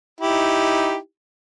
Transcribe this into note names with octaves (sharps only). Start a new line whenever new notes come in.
D#4 E4 G4